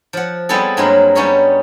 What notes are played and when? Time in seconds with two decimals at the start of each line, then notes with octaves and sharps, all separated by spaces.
0.13 F3 F#5
0.49 G3 B3 C4 E4 G#4 A4
0.77 G2 F#3 G#3 A#3 E4 F4
1.15 G3 B3 C#4 D#4 C#5 B5